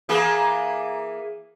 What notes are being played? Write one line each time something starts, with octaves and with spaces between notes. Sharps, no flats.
E3 A#3 G#4